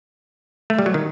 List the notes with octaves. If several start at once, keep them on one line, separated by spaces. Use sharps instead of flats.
A3
G3
F#3
D#3